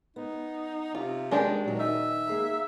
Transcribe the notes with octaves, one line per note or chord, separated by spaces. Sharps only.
B3 D#4
C3 F4
D#2 G#3 A#3 D4 G4 B4
A#2 D#3 F#3
D#4 E5
A#3 G#4 A#5